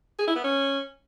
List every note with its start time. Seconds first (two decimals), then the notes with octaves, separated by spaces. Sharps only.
0.19 G#4
0.27 E4
0.36 B3
0.44 C#4